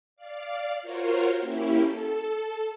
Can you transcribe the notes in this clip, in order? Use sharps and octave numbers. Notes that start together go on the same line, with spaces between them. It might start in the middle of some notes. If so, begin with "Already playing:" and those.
D5 F5
F4 F#4 A#4 C5 C#5
A#3 C#4 E4 G4
A4